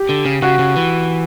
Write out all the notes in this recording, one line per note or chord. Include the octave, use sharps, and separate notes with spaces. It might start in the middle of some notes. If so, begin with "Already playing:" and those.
Already playing: G4
D3
C#3
C#3 F#4
C#3
E3